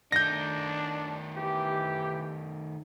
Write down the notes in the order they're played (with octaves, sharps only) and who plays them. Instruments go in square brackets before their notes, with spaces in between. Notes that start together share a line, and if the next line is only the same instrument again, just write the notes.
[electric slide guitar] D#3 A3 D#4 [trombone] D4 [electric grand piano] G6 A#6
[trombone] E3 [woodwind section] G4